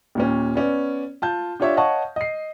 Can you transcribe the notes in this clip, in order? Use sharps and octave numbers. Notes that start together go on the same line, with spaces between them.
D#2 A#2 C#4
B3 C#4 D5
F4 A5 G6
D4 F4 G4 C#5 D5 E5
C#5 D#5 F5 F#5 A5 C#6
D#5 C7